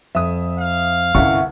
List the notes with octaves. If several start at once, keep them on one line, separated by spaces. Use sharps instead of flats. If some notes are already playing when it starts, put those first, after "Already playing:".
F2 E5 D#6
F5
G1 C2 C#4 E4 E5 F#5 C#6